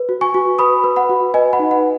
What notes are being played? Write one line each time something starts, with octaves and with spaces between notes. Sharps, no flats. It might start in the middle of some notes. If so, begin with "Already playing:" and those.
Already playing: B4
F#4
G#5 C#6
F#4
B4 B5 D#6
B4
F#5 B5
F#4
B4 D#5 G#5
F#5 B5
D#4
F#5